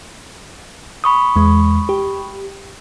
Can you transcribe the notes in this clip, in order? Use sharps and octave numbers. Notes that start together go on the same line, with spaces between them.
B5 C#6 D#6
E2 G#3
G4